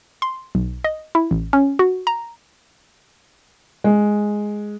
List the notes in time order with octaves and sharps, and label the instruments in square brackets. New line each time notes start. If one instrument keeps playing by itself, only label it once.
[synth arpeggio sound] C6
B1
D#5
E4
A1
C#4
F#4
A#5
[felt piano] G#3